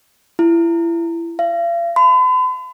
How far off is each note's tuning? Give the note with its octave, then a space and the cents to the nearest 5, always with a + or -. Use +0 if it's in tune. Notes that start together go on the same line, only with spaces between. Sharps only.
E4 +30
F5 -40
B5 +45